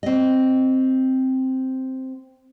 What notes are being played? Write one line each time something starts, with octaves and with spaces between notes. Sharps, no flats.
C4 D#5